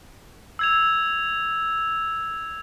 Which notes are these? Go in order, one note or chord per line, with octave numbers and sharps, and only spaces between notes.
E6 G#6 F7